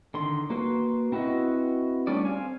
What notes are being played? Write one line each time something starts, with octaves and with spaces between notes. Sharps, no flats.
D3 D#3 C6
A#3 F#4 B4 C6
C4 E4 F#4 B4 D#5
G3 A3 C#4 D4 D5
C4 F5 G#5